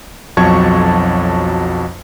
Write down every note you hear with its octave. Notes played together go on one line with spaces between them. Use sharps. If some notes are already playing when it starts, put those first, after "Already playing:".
B1 F2 F#3 A5 C#6 G#6